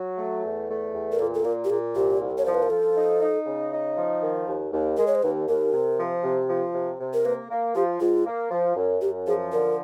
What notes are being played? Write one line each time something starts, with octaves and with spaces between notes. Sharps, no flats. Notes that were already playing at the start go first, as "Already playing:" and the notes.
Already playing: F#3
A3
E2
A3
E2
A#4
A#2 A4
A4
A#2 A#4
G4
A#2 G#4
C2 G4
C2
C#5
F3 C5
B4
A#4
F3 A4
D#4
D#4
C#3
D#4
F3
D#3
D#2
D#2
G#3 A#4
C#5
C5
D#2 B4
D#2 A#4
C3
F3
C3
F3
C3
C3
A#4
A#3 B4
A#3
F3 G4
G#2 F4
A#3
F3
F#2
F#2 G4
F3 G#4
D3 A#4